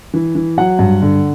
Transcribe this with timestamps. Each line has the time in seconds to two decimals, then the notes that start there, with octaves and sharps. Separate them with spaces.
0.14 E3
0.35 E3
0.57 F#3 F#5
0.79 G2
1.02 D3